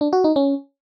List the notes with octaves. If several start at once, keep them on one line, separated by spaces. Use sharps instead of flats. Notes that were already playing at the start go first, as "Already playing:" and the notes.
D4
F#4
D#4
C#4